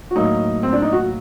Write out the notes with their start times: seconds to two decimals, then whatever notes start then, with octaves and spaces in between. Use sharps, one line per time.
0.11 F#4
0.16 A2 F#3 A#3 D#4
0.63 C4
0.73 D4
0.82 D#4
0.92 F#4